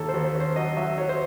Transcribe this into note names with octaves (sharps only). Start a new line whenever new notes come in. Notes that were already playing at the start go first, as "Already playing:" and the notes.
Already playing: D#2 A4
C5
D#2
C5
C#4 C5
F#3 D#5
F#3 E5
F#3 C#5
C5